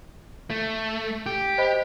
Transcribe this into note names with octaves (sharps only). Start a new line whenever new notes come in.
A3
G4
C5 D#5 B5